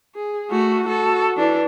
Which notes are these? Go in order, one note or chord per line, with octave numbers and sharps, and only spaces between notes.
G#4
A3 F#4
F#4 A4
E3 D4